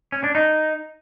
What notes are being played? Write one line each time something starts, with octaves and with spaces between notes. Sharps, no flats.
C#4
D4
D#4